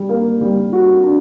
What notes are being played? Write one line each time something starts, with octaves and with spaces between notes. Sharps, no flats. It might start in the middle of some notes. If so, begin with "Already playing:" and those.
Already playing: G3
A#3
G3
F#4
D4